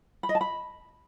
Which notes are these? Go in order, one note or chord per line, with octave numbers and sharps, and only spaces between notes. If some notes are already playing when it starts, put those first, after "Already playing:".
B5
D#5
A5
B5